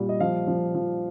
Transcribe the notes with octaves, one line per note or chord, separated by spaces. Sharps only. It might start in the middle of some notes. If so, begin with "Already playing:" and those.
Already playing: A#2 G3
D#5
F3 F5
F3
F3